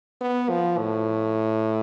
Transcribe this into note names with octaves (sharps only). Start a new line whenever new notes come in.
B3
F3
A2